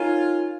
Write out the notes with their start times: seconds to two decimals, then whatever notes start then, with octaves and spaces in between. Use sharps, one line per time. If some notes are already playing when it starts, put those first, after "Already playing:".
Already playing: D#4 F4 A#4 C#5 F5 G#5